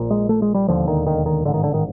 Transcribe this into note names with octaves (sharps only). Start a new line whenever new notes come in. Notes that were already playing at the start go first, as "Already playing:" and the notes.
Already playing: A#1 A#2
G#3
A3
G#3
G3
E1 D#2 D3 F3
D#3
D#3
D#3
A1 G#2 D3
D#3
D3
D#3